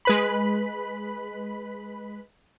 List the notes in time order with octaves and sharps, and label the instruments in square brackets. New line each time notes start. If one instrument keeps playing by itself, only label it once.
[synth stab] G#3 B4 B5